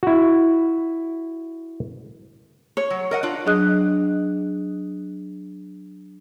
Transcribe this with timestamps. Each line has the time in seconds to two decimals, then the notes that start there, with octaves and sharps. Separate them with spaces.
0.03 E4 F#4
2.77 C#5
2.90 F#3
3.11 A#4 D#5 F#5
3.23 D4 F4
3.46 F#3 D4 G#4 D#5 D#6 F#6